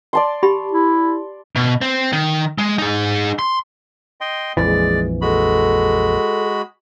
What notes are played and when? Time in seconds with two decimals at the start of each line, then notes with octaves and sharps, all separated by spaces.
0.13 D5 A5 C6
0.43 G4 B5
0.72 E4
1.56 B2
1.81 C4
2.13 D#3
2.58 G#3
2.78 D#4 G#4
3.39 C6
4.21 D#5 G5 C6
4.57 A#1 F2 E3 G#3 D5
5.22 G#3 F#4 A4 B5